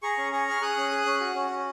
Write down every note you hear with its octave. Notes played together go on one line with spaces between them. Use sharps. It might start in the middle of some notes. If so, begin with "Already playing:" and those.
G#4 A#5 C#6
C#4
G#4 A#5 C#6
G#4 F6
G#4 D#6 F#6
C#4
G#4
C#4
F#4
C#4
C#4